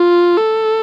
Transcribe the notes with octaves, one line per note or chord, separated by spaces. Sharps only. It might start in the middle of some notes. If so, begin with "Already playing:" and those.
Already playing: F4
A4